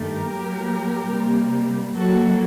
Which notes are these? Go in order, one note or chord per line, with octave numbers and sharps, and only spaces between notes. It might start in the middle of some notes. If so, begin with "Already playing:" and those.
Already playing: G2 D#3 A3 G4 A#4
A2 F#3 A#3
C3 G3 A#3
A2 F#3 A#3 F#4 A4